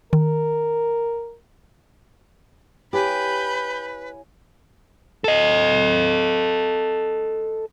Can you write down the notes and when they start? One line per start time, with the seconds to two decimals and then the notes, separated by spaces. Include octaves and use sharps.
0.13 D#3 A#4
2.93 E4 G4 B4 C#5 G#5 B5 G6
5.24 A4 D#5